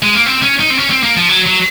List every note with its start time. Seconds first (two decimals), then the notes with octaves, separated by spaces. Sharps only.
0.02 G#3
0.15 A#3
0.26 C4
0.43 C#4
0.60 D#4
0.70 C4
0.78 C#4
0.91 C4
1.03 A#3
1.17 F3
1.29 F#3
1.46 F#3